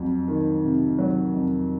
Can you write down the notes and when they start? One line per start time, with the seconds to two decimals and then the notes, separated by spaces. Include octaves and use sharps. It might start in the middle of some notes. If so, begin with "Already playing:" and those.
Already playing: F2 F#3
0.28 D#3
0.63 C3
0.99 F#3
1.34 F2